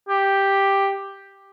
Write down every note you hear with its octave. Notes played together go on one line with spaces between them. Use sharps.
G4